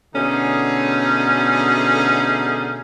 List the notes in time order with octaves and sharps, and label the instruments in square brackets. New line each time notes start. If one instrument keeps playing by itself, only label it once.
[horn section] B2 D3 A3 C#4 D#4 G#4